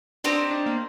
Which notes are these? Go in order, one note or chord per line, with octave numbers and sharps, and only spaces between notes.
C4 D4 D#4 G4 C5
D4
A#3